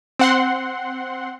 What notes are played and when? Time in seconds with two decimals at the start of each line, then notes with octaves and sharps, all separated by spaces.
0.19 C4 F#5 C6